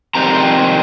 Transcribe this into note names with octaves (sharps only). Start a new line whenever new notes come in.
F2 C3 D#3 G3 C4 A#5